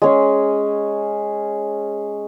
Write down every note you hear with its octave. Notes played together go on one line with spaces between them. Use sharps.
G#3 C#4 G#4